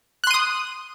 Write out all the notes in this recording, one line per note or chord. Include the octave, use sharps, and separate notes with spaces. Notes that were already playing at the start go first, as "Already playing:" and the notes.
C6 D#6 F#6 D#7